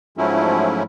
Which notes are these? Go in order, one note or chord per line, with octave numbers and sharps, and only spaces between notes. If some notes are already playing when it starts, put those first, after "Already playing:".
G#2 F3 F#3 A3 C#4 E4